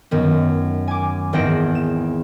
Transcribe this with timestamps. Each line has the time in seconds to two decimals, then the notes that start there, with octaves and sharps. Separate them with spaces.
0.11 F#2 D#3 B3
0.88 G#5 D6
1.33 G#1 E2 C5 F#5 A#6 D7
1.75 E7